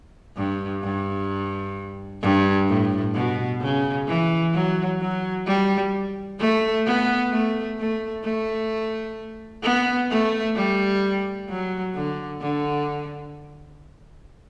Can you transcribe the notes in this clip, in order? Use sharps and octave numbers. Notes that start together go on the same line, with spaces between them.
G2
G2
G2
A2
B2
C#3
E3
F#3
F#3
G3
A3
B3
A3
A3
A3
B3
A3
G3
F#3
D3
D3